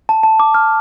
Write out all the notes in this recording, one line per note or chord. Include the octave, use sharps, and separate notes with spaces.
A5
A5
D6
F6